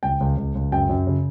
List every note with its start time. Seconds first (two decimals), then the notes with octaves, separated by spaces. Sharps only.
0.03 C#2 G5
0.20 C#2
0.37 C#2
0.55 C#2
0.72 F#2 G5
0.89 F#2
1.07 C#3